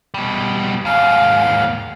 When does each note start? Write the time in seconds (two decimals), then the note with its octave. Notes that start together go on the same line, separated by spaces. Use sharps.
0.14 B2 G3
0.85 D#2 G#2 F5